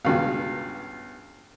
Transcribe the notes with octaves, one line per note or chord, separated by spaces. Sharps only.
C#2 G2 B2